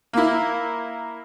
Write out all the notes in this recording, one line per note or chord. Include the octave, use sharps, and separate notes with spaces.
A#3 E4